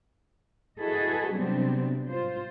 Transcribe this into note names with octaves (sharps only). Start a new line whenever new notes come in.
E4 F#4 G#4 A4 B4 D#5
C3 F#3 G3 B3 C4 D4
F4 C5